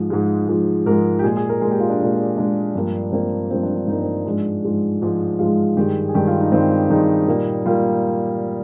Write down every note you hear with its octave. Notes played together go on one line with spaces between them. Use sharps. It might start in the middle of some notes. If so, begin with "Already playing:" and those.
Already playing: G#2 F3 G#3
G#2 F3 G#3
G#2 F3 G#3
G#2 F3 G#3 A#4
G4
A#2 G#3 G#4
G#4
A#4
A#2 G#3 G#4
G4
F4
D4
A#2 G#3
A#2 G#3 D4
G2 F3 A#3
G2 F3 A#3 C4
G2 F3 A#3 C4
D4
D4
G2 F3 A#3 D#4
C4
G#2 F3 G#3 D4
G#2 F3 G#3
G#2 F3 G#3
G#2 F3 G#3 F4
G2 D#3 G#3 G4
G#4
G2 D#3 G#3 G4
F4
D#4
G2 D#3 G#3 C4
G2 D#3 G#3 D#4
A#2 G3 A#3
A#2 G3 A#3 F4